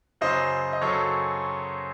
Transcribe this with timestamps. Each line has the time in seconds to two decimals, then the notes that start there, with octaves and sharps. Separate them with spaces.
0.21 F#2 C#3 F#3 C5 D#5
0.73 D#5
0.82 F#2 C#3 F#3 A4 C#5